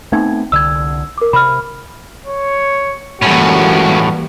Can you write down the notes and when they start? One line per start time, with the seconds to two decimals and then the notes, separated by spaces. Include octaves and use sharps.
0.12 A3 B3 C4 D#4 G#6
0.52 C2 D3 E6 G#6
1.18 A#4 D6
1.33 C3 B5 F6
2.26 C#5
3.22 C#2 F#2 A2 E3 G3 A#3 C#4 F#4